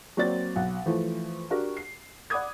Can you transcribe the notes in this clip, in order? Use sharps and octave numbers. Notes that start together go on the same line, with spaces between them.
F#3 A#3 C4 D5 A6
B1 F#5
E3 F3 A3
D4 F#4 G4 A#4
C7
D5 F#5 B5 D6 D#6 G#6